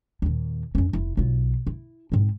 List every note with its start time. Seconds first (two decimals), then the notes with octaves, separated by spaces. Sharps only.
0.22 D#2 A#2
0.75 F2 C#4
0.93 F1 E4
1.17 B1 F4
1.67 E4
2.12 G#2 C4